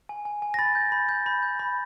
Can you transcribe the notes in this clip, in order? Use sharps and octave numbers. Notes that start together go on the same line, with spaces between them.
G#5
G#5
G#5
A#6
B5 A6
G6
B5
G6
B5
G6
B5